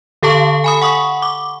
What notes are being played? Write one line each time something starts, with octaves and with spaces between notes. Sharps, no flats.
D3 G4 A4 F5 A5 C#6
G#5 B5 D#6
F#5 C#6 D#6
D6